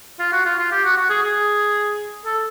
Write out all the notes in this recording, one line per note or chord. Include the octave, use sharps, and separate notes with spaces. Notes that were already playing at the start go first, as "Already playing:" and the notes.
F4
F#4
F4
F4
G4
F#4
F#4
G#4
G#4
A4